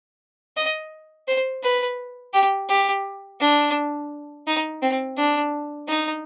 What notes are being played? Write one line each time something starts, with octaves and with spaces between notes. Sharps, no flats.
D#5
C5
B4
G4
G4
D4
D#4
C4
D4
D#4